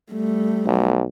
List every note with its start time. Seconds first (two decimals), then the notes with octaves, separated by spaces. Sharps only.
0.12 G3 A3
0.66 B1